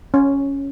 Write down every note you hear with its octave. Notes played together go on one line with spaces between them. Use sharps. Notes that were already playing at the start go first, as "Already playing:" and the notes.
C#4